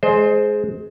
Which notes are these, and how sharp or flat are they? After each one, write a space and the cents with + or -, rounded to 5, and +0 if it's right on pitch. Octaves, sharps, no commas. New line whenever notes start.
G#3 +20 C5 +0 D#5 -40